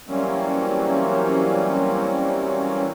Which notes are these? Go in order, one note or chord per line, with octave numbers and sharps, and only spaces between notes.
E3 F#3 G3 A#3 C4 C#4